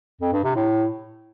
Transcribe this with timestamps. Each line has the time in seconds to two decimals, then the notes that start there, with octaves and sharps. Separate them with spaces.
0.21 F2
0.33 G2
0.44 C3
0.56 A2